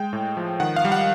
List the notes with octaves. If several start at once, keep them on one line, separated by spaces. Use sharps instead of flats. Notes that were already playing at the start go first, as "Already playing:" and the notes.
Already playing: G#3 G5
A2
F3
D#3 F#5
F5
G3
F#5